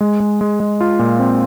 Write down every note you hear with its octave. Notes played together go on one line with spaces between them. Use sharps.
G#3
G#3
G#3
G#3
F4
A#2
C4